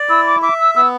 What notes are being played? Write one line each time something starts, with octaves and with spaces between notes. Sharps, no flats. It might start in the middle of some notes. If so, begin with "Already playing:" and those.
Already playing: D5
E4 E6
D6
E5 D6
E6
B3 E6